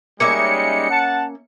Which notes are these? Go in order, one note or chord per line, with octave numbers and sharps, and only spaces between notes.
G3 G#3 A#3 C#4 D#4 E5 C#7
F#5 A5